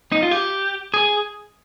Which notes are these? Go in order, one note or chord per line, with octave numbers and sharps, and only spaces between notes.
D#4
F4
G4
G#4